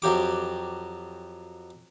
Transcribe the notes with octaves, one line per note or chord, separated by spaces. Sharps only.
F2 F#3 G4 D6